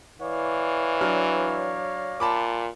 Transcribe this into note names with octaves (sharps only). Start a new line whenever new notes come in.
E3 C#5 D5 F5
F#3 D4 F6
A#2 A5 B5 D6